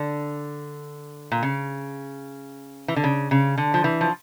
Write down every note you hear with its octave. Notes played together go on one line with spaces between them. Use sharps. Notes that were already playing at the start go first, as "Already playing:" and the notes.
Already playing: D3
A#2
C#3
E3
D3
C#3
C#3
D3
F3
E3
F3